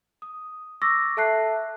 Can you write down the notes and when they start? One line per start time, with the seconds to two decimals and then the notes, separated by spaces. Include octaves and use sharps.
0.22 D#6
0.82 C#6 D6 E6 A6 A#6
1.17 A4 E5 A5 F#6 C7